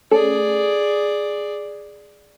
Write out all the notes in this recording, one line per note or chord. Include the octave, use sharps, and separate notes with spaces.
A3 C#4 G#4 A4 D5